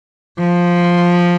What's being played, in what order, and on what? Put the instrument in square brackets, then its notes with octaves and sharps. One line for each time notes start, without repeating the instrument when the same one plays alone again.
[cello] F3